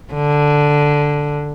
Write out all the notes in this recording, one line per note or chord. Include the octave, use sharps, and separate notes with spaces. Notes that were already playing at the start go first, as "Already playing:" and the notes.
D3